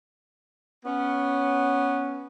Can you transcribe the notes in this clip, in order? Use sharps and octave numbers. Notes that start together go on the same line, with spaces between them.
B3 C#4